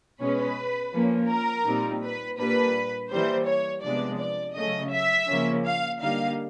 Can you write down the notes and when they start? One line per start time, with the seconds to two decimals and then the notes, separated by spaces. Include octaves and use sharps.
0.20 B2 G#3 C#4 B4
0.93 F3 A#3 C#4
1.29 A#4
1.66 A#2 G3 C4 D#4
2.03 B4
2.38 A#2 G3 A#3 D4 B4
3.11 E3 G3 A#3 C5
3.47 C#5
3.83 C3 F3 G#3 B3 D4 D5
4.19 D5
4.56 C#3 F#3 A3 C#4 D#5
4.93 E5
5.28 C#3 F3 A#3 C#4
5.66 F5
6.02 D3 G3 A#3 D#4 F5